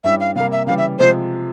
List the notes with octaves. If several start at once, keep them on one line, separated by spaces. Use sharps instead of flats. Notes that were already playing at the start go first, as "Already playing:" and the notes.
G2 G3 C#4 E4 E5
F5
C3 G3 A#3 F5
E5
C#3 E3 G3 F5
E5
C3 F3 G#3 C5